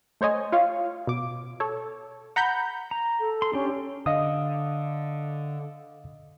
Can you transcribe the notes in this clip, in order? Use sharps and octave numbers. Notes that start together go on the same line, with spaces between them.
A3 C5 C#5 D#5 G#5
F4 C#5 F5
B2 D6
A4 C#5
F#5 A#5 B5 G6
A#5
A4
C6
C#4 D4 G4
D3 D#5 F5 D#6